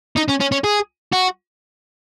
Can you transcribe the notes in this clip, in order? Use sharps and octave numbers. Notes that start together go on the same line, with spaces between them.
D#4
C#4
C#4
C#4
G#4
F#4